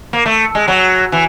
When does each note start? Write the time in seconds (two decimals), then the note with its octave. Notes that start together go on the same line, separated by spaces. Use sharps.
0.13 A#3
0.26 A3
0.55 G#3
0.68 F#3
1.12 E3